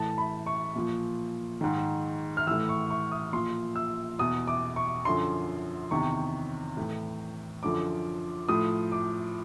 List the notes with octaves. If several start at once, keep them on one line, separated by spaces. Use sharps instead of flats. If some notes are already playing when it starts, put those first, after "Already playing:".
Already playing: A2 E3 A5
B5
C#6
A#2 F3
G#2 D#3
F6
A2 E3 E6
C#6
C#6
D#6
A#2 F3 C6
E6
E2 B2 D#6
D6
C#6
F#2 D3 F3 C6
E2 C3 D#3 C#6
A2 E3
F#2 D3 F3 D6
A2 F3 D#6
D6